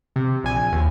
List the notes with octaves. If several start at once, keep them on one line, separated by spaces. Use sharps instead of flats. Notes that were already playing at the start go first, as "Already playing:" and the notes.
C3
A#1 G#5
D#2